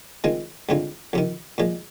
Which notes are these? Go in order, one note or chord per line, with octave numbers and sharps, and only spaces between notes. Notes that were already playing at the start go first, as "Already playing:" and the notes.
D#3 G#3 C4 F4
G2 D3 G#3 C4 F4
F2 C3 D#3
A#2 F3 G#3